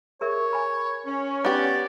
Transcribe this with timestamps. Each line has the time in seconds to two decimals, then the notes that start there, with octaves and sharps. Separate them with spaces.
0.21 G#4 A#4 C#5 E5
0.53 G#5 B5
1.06 C#4
1.45 B3 G4 D5